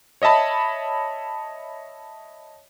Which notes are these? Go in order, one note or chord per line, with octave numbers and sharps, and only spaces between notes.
C#5 D#5 E5 A5 B5